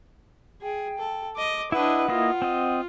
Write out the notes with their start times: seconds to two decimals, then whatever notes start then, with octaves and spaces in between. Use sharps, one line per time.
0.62 G#4 G5
0.98 A4
1.36 D#5 D6
1.72 D4 E4 B4 D#5 F#5
2.08 A#3 E4 F4 D#5
2.42 C4 D#5